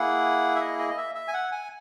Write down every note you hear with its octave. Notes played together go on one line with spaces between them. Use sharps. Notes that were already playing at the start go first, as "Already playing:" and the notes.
Already playing: A#3 E4 G#4 F#5
E5
D#5
D#5
D#5
E5
E5
G#5
F#5
G#5